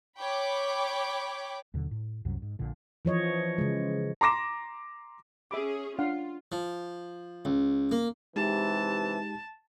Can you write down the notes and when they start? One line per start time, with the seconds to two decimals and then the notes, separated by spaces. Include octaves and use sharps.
0.18 C#5 G5 B5 D6
1.74 D#2 B2 D3 F#3
1.91 A2
2.25 C2 F#2 C3 F#3
2.42 G#2
2.59 A#1 A#2 D3
3.05 E3 F3 C#5 D#5
3.58 C#3 G#3
4.21 A#5 C6 D6 A#6 E7
5.51 C#4 G#4 E5 B5 D6
5.99 D4 F4 F5 F#5
6.52 F3
7.45 C#2
7.91 A#3
8.36 C3 E3 G#3 D#4 G4 A5